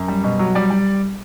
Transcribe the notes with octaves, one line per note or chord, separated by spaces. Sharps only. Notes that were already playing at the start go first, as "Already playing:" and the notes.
Already playing: F#2
G3
B2
F#3
G3 D5
G3